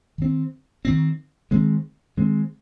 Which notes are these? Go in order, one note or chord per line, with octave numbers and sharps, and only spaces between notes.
D#3 C4
D#3 C4
D#3 G#3 C4
D#3 G#3 C4